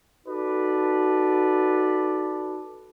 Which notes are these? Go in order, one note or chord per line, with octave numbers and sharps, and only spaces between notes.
D#4 F#4 A4 B4 D5